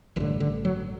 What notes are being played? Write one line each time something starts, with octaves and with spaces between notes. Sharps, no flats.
A1 G2 D3 E3
D3
F#3